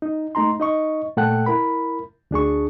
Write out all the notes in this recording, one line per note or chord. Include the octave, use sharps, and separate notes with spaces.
D#4
A3 D#4 A#5 C6
D#4 D#5 C#6
A#2 A3 A4 F#5 G5 F#6
E4 A#4 B5
D2 D4 G#4 C#6